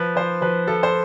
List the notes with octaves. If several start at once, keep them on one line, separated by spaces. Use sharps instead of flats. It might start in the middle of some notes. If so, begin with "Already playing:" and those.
Already playing: F3 B4
F3 C5
F3 B4
F3 A4
C5